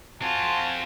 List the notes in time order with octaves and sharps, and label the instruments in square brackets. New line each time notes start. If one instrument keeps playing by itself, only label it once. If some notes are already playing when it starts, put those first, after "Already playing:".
[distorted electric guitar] C4 F4 [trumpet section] F#4 G#5 A5